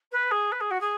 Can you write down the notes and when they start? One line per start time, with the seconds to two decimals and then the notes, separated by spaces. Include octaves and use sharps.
0.11 B4
0.31 G#4
0.51 B4
0.60 G#4
0.70 F#4
0.80 G#4